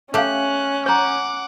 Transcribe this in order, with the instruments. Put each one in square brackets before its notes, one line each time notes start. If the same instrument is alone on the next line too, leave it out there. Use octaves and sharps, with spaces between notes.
[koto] A3 G4 [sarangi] C#4 [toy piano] A4 F5 [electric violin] F#6
[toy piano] C#5 A#5 [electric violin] F#5 D6